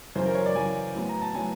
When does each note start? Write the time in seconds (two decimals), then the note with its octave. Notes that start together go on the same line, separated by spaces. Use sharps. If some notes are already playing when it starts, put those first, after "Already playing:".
0.15 F#2 C#3 E3 C5
0.25 A#4
0.35 C#5
0.46 D5
0.55 F#2 C#3 E3 G#5
0.95 A2 F#3 B3
1.09 A#5
1.21 A5
1.35 A2 F#3 B3 G#5